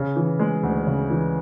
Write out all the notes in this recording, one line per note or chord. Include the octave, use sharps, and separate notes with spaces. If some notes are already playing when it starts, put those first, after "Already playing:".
Already playing: C#3
E3
G#3
D2
C#3
E3